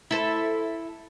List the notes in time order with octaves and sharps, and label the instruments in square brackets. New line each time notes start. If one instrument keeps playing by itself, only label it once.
[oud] E4 A4 C5